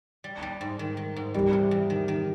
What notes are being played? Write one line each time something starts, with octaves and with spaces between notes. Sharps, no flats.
G3
G3
G#2
D#3
D#3
G#2
E2 G3
C3
E2
D#3
D#3